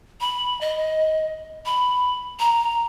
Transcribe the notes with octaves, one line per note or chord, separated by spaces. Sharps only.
B5
D#5
B5
A#5